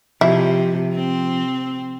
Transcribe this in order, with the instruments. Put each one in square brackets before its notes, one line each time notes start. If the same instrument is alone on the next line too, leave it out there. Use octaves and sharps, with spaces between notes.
[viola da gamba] C3 [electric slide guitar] F3 [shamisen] E4
[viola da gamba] C4